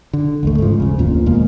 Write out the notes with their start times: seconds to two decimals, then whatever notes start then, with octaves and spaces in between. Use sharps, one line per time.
0.13 D3
0.43 A1 D#2 A3
0.58 G#2 C#3 F3
0.80 D#1 C#3
0.98 F1 D2 A#2 F3
1.26 E2 B2 G#3 A#3